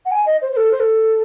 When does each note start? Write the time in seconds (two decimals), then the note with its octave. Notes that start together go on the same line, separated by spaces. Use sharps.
0.05 F#5
0.11 G#5
0.26 D#5
0.42 C5
0.52 C5
0.57 A4
0.71 C5
0.80 A4